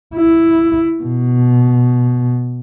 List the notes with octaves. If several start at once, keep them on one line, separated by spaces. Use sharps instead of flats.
E4
B2